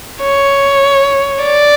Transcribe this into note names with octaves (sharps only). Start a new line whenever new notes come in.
C#5
D5